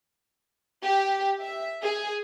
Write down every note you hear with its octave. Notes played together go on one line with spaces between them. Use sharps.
G4
E5
G#4